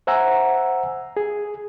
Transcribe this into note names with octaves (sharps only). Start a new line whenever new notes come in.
C5 E5 F#5 G#5 A#5 E6
G#4